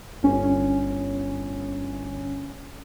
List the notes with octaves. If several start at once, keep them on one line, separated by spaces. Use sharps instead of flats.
G1 C#4